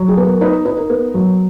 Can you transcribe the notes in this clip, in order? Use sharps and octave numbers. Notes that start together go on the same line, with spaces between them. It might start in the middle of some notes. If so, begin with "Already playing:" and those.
Already playing: F#3
G#4
B3
A#4
D#4 B4
D#4 B4
A#4
B3
F#3